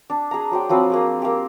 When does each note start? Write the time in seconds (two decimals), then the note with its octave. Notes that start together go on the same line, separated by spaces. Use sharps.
0.10 D4
0.31 G#4 A#5
0.51 F#3 C5 G5
0.69 F3 F#3 C4 B4
0.90 A#3 G#4 C5
1.22 A#3 G4